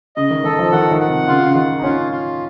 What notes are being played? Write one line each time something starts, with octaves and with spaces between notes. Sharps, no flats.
C#3 D#5
D#3
D#3 A4
F3
D#3 F#5
D#3
F#5
C3
C#3 F4
C#3
D#3 F#5
D#4
C#4 F4
F4